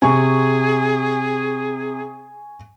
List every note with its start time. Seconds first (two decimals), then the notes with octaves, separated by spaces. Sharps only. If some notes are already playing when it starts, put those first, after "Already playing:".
0.02 C3 G#4 G#5 C#6